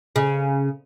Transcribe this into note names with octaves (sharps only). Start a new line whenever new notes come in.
C#3